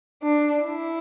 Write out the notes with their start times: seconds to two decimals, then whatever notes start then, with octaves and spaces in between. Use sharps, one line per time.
0.22 D4
0.64 E4